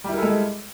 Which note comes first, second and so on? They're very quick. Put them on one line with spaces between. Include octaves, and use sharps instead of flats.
G3 E4 A#4 A4 G#3